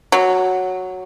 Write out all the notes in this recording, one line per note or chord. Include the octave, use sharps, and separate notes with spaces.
F#3